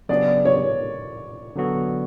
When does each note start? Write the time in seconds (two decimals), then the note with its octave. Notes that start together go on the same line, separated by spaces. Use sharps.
0.09 C#3 F#3 B3 D4 G#4 D5
0.45 C#5
1.56 D3 F#3 B3 F#4 A4